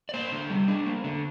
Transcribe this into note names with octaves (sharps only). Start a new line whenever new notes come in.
D5
A#3 C5
D3
G3
D4
A#3
D3